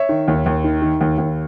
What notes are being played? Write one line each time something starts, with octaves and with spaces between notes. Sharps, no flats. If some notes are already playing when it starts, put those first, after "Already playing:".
Already playing: C#5 E5
D#3
D#2
D#2
D#3
D#3
D#2
D#2